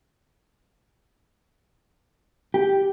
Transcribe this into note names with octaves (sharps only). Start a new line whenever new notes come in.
G4